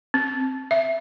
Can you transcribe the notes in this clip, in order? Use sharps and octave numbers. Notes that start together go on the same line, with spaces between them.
C4
E5